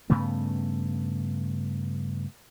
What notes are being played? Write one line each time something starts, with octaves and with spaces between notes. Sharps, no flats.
G2 C#3 A3 B3